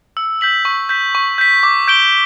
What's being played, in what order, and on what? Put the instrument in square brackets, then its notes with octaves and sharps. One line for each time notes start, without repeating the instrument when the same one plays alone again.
[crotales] E6
G6 B6 F#7
C#6
G6 B6
C#6
G6 B6
D6
G6 D7 G7